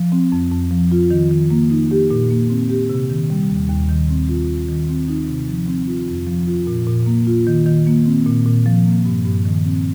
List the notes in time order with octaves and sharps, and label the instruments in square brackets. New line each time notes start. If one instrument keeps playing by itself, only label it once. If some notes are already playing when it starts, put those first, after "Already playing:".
Already playing: [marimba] F3
C4
F2
F2
F3
F4
D#3
D#3
A#3
D#4
G4
A#2
A#3
C4
G4
C3
D#3
G3
D#2
D#2
D#3
C4
F4
D#2
D#3
C4
D#4
C3
F3
C4
F4
F2
F3
F4
A#2
A#2
A#3
F4
D#3
D#3
A#3
C4
A#2
A#2
F3
A#3
G2
G2
D#3
C4